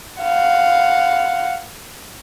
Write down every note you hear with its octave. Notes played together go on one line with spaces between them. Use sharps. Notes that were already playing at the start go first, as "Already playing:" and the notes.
F5 F#5